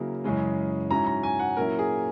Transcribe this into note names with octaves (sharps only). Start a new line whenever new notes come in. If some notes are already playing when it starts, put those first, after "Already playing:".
Already playing: C#3 F#3 A#3 E4
F#2 C#3 E3 G#3 C#4
G#2 F#3 C#4 E4 A#5
A#5
G#5
F#5
A#2 F#3 C#4 E4 A#4
G#4